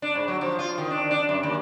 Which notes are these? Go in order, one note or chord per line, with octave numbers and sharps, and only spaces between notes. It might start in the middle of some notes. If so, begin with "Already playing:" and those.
D4
G#2
F#3
F3
F4
D#3
D4
D4
F#2
D#2